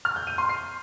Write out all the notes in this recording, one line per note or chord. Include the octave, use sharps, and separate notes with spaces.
F6
G6
D#7
C6
C7